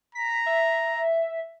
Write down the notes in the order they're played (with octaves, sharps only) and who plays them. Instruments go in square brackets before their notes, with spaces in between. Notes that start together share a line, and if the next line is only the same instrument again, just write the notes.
[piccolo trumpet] A#5 [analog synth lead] B6
[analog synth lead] E5